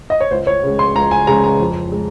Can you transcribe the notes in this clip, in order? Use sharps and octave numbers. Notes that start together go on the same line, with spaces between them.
D#5
C#5
C#2 C5
C#5
C#3 G#3
C6
C#2 A#5
G#5
C#3 G#3 A#5
A#5
F2
G#3